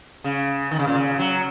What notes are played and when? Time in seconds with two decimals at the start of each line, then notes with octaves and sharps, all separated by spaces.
0.24 C#3
0.71 D#3
0.79 C#3
0.87 A#2
0.95 C#3
1.19 F#3